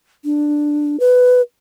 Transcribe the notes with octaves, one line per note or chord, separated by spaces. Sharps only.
D4
B4